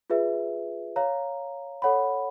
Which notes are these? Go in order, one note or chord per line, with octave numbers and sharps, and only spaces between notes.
F4 G#4 B4 E5
C#5 F5 A#5
A4 C#5 F#5 B5